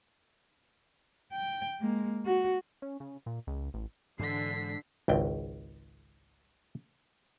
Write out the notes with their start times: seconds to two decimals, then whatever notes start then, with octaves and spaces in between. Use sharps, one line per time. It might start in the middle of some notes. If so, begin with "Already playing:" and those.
1.32 G5
1.80 G#3 A#3
2.26 F#4
2.82 C#4
3.00 C#3
3.26 A#2
3.47 C#2
3.74 A1
4.19 G#2 D3 E3 G#3 B6 C7
5.08 G#1 C#2 G5